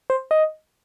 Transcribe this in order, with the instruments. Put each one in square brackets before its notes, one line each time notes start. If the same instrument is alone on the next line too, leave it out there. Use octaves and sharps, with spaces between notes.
[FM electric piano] C5
D#5